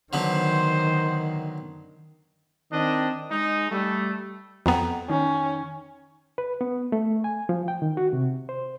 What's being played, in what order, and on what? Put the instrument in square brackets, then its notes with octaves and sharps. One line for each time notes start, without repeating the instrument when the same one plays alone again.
[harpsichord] D3 F#3 B3 [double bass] D#3 [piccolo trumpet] C5
[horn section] D#3 C4 D4 D#5
G#3 D#4
G3 A3
[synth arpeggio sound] F2 B3 [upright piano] F#5 G5 A#5
[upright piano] D#3 [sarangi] C#4
[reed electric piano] B4
B3
A3
G#5
F3
G5
D#3
F#4
C3
C5